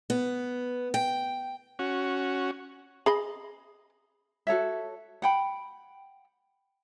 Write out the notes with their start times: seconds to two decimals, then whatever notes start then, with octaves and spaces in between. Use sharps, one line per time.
0.10 B3
0.94 G5
1.79 C#4 F#4
3.06 G#4 D#5 B5
4.47 F#4 A4 C#5 E5
5.22 F#5 G5 B5